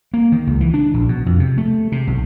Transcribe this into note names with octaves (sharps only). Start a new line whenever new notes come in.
A#3
D#3
C#2
E3
D4
A#1
B2
F2
C3
A3
C3
B1